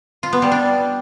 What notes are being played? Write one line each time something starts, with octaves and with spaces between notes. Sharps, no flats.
F4
B3
G3
D4